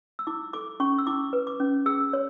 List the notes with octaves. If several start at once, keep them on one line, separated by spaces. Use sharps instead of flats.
E6
E4 D6
A4 D6
C#4 C#6
E6
E4 D6
B4
D6
C#4
G#4 E6
C#5